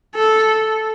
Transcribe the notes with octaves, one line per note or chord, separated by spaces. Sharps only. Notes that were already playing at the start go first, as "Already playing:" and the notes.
A4